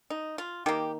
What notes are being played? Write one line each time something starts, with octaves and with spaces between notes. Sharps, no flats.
D#4
F4
D#3 A#3 G4